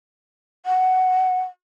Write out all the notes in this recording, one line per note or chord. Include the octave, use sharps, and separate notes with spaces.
F#5